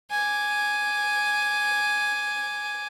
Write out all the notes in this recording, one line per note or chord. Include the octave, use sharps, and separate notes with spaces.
G#5 D6